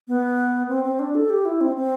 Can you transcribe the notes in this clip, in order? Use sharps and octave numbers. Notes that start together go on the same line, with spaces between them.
B3
C4
C4
D4
A4
G4
E4
C4
C4